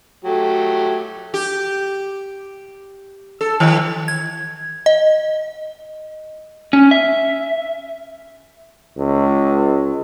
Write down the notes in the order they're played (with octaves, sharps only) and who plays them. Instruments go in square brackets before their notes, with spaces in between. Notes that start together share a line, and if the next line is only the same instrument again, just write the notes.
[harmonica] F#3 A3 G4
[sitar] G4
A4
D#3
[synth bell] G#6
D#5
[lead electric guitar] C#4
E5
[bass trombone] C#2